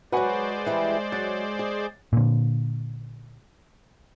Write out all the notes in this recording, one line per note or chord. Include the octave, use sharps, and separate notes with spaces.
F#3 G#3 F#4 B4 C5 D5 F#5 G#5
E3 G3
F#3 A6
G#4
A#2 D3